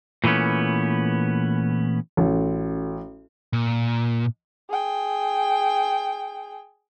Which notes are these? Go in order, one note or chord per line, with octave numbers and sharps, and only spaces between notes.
A#2 E3 A3 B3 C#4
A1 C#4 F#4 A4
A#2
G#4 G5